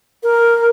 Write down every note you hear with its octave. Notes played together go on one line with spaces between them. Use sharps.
A#4